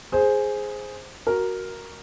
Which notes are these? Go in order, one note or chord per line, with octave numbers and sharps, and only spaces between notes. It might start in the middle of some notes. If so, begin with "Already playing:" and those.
G#4 C5
F#4 A#4